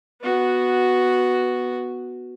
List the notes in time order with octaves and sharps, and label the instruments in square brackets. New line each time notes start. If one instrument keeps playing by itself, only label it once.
[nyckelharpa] B3 F#4